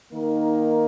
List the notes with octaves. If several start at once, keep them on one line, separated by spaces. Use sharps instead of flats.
D#3 A#3 D#4 A#4